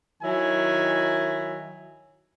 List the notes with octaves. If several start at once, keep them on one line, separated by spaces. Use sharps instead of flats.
D#3 F#3 E4 G#5